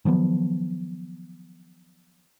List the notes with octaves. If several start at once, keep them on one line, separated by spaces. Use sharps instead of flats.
D#3 F3 F#3 B3